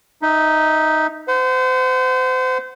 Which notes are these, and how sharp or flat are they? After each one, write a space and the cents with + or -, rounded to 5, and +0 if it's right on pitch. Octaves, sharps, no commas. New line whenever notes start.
D#4 +0 E5 -20
C5 -30 F#5 +0